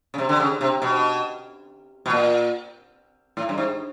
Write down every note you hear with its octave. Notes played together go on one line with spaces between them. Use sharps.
C#3
C3
D3
C#3
C3
B2
B2
A#2
A2
G2
G#2